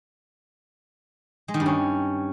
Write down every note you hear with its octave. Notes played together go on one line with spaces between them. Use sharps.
G#3
D#3
G2
C#4